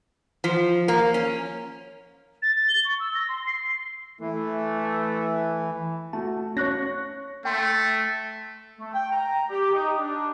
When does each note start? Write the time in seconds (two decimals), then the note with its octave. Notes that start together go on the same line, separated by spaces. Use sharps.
0.44 F3
0.88 A#3
1.14 C#4
2.42 A6
2.68 G7
2.85 C#6
3.00 E6
3.14 A#6
3.28 C6
3.46 C7
4.21 E3 A3
6.13 A3 F#4 A5
6.57 C#4 C#5 C#6 F#6 A#6
7.45 A3 G5 C6
8.79 A3
8.93 G5
9.11 A#5
9.50 G4
9.73 D#4
9.99 D4